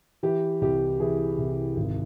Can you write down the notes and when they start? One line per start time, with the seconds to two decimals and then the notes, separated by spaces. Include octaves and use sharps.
0.23 E3 G4
0.61 C2 G4
1.00 E3 G#4
1.38 C2
1.76 G#1